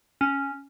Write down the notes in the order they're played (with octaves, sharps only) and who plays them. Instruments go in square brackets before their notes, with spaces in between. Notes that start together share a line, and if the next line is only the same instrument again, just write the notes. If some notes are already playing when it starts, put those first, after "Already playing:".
[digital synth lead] C#4